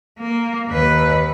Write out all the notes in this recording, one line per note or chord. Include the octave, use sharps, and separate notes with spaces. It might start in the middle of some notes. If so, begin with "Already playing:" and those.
A#3
D#2 B4